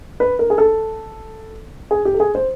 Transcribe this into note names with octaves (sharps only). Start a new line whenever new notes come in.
B4
A#4
G#4
A4
G#4
G4
A4
G#4
C5